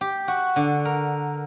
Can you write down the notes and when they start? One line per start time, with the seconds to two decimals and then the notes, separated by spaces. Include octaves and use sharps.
0.01 G4
0.28 F#4
0.56 D3
0.85 A#4